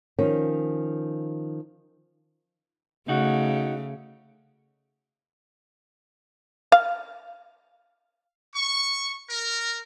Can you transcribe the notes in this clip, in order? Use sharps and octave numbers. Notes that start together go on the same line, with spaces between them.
D#3 F3 C#4
C#3 A3 D#4 F#4
F5
C#6
A#4